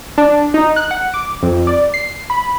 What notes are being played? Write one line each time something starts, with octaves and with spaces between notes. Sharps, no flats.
D4
D#4
F#6
F#5
D6
F2
D5
C7
B5